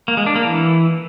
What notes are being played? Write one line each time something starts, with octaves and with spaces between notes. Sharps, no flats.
A#3
G#3
D4
A#3
E3